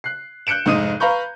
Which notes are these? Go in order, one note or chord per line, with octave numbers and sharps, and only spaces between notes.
F#6 C7
F#6 G6 C#7 D7 E7
F1 G#2 D#4 D#6 D#7
B4 F5 A#5 B5 C#6 G6